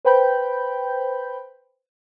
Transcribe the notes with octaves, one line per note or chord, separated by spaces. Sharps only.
B4 C5 G5 B5 G6